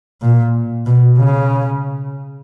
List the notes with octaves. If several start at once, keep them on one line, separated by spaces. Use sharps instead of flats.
A#2
B2
C#3